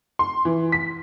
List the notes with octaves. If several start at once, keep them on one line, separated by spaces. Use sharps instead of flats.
C6
E3
B6